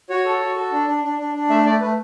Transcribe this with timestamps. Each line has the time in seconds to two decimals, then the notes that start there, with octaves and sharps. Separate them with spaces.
0.09 F#4 C#5
0.25 A4
0.40 F#4
0.56 A4
0.72 D4
0.87 D4
1.04 D4
1.19 D4
1.34 D4
1.49 A3 E5
1.66 A3 D5
1.81 A3 B4